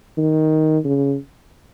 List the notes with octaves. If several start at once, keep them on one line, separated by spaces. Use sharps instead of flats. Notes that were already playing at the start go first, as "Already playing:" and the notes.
D#3
C#3